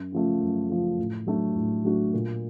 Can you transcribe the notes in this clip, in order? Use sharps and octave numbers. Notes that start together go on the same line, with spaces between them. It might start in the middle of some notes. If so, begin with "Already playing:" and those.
Already playing: F#2
C#3 F3 A3
F#2
C#3 F3 A3
A2
F#3 A3 D4 F#4
A2
F#3 A3 D4 F#4
A#2